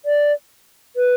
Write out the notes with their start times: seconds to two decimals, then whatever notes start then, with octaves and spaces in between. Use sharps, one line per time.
0.05 D5
0.96 B4